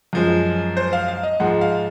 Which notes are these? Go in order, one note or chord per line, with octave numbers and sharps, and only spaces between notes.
F#2 F3 G#3
C5
F5
F5
D#5
G#2 F3 G#3 F#5
F5